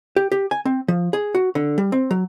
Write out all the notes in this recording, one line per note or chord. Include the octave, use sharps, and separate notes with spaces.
G4
G4
G#5
C4
F3
G#4
F#4
D3
G3
C4
F#3